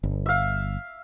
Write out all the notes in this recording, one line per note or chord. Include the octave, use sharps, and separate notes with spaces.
G1
E5 F5